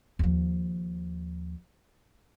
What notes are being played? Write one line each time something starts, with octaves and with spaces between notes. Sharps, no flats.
D#2 F3